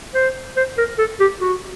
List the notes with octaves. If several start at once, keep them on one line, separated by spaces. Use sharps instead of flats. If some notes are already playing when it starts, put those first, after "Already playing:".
C5
C5
A#4
A4
G4
F#4